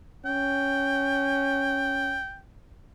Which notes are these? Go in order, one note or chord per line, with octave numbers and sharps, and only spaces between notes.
C#4 G5